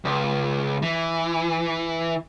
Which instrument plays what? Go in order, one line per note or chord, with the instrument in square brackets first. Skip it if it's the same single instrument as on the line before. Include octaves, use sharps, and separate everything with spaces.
[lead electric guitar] C#2
E3